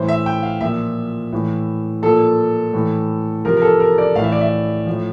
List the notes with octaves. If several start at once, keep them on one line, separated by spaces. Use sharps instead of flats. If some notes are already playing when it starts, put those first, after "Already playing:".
Already playing: A2 E3 C5
E5
G5
F5
A#2 F3 E5
A2 E3
A#2 F3 A4
A2 E3
C3 F3 A#4
A#4
A4
A#4
D5
A2 E3 F5
E5
D5
E5
A2 F3